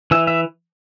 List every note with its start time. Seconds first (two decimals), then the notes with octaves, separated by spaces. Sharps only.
0.11 E3 E5
0.27 E5